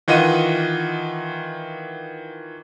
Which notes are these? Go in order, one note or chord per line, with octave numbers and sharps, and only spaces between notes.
D#3 E3 F4 D#5 F#5 D#7